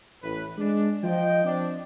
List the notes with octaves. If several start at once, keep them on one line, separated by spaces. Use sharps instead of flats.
A1 A2 B4
G#3 D4
F3 D#5 G5
C4 D4